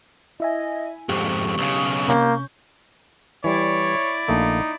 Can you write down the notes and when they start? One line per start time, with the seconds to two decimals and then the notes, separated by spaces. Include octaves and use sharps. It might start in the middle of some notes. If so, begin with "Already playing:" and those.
0.40 E4 D#5 E5 G#5
1.09 F2 G#2 G4 C#6
1.58 B1 C#3
2.08 C3 A#3 C#4 G6
3.44 E3 G3 E4 C#5 D5
4.28 A#1 A3 A#3 D#4